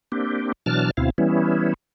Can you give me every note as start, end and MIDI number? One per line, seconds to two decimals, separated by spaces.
0.12 0.52 58
0.12 0.52 60
0.12 0.52 62
0.12 0.52 67
0.66 0.91 47
0.66 0.91 52
0.66 0.91 54
0.66 0.91 62
0.66 0.91 81
0.66 0.91 89
0.97 1.10 38
0.97 1.10 47
0.97 1.10 60
0.97 1.10 64
0.97 1.10 77
1.18 1.74 52
1.18 1.74 55
1.18 1.74 59
1.18 1.74 61
1.18 1.74 64